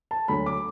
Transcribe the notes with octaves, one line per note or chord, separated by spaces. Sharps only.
A5
D2 D3 F#3 B5
D6